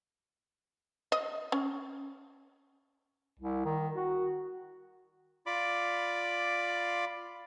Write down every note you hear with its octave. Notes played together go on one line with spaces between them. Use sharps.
D#5
C#4
C2
D#3
F#4
F4 D5 B5 D6